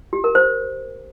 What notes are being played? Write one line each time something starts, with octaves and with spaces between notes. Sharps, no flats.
G4
A#4
C5